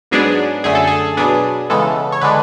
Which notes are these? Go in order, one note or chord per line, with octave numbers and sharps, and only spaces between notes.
G#2 F#3 B3 D4 G#4
F#2 D3 A3 G#4
A4
G#4
B2 F#3 B3 D4 G#4
C#3 E3 G#3 B3 A4
C#5
D3 G#3 D4 B4